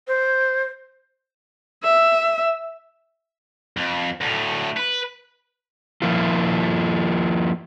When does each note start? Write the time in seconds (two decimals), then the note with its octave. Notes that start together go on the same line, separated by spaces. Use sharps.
0.08 C5
1.84 E5
3.77 F2
4.21 D2 A2
4.77 B4
6.02 F3 A#3 E4 F4